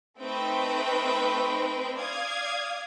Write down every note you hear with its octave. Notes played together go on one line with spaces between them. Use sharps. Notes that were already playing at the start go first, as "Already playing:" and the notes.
A3 C4 D#4 B4 G5
D5 F5 D#6 G#6